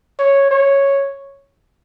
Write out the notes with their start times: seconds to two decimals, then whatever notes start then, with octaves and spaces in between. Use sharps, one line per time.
0.19 C#5
0.51 C#5